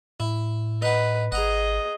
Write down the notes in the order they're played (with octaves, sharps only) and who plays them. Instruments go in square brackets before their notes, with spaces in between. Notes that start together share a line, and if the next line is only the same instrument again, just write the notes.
[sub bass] A2 [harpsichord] E4
[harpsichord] D#4 F#5 [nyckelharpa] B4
[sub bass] G#1 [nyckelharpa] G#4 D#5 [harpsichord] F#5 A#5